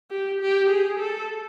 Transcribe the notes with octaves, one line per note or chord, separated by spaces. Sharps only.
G4
G4
G#4
A4